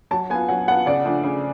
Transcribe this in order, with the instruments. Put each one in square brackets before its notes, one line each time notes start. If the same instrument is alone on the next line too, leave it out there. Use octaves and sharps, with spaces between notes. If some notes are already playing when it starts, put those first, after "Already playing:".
[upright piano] F#3 [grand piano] A5
[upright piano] B3 [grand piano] G#5
[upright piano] F4
[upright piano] F#3 [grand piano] F#5
[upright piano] B3 [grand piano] F#5
[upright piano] F4
[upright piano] C#3 [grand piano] D5
[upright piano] F3 A3 D4
C#3